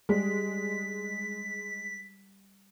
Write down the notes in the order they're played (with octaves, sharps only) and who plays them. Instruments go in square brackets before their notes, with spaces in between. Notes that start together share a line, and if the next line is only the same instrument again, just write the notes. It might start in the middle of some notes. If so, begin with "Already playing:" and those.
[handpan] G3 [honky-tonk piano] G#3 [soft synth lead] B6